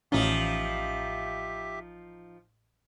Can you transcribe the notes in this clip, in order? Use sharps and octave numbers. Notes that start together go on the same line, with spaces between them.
A1 F3 C#4 D#4 G4 E5